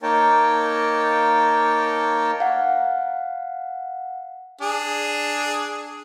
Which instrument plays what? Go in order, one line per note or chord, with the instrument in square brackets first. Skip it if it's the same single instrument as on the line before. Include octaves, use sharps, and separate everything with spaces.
[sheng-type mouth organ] A#3 D#4 A#4 C#5 G5 A5
[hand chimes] F5 F#5
[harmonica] D4 G#4